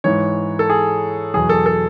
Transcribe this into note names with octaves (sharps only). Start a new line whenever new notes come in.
G#2 E3 C#5
A4
G#4
E2 B2 F#3 G#4
A4
A4